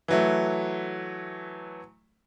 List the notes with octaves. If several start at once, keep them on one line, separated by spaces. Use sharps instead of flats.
E3 F#3 A3